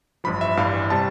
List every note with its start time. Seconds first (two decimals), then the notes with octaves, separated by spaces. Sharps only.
0.24 A1 G2 F3 B5
0.41 E5
0.57 A1 G2 E3 G3 F5
0.90 C3 G3 A5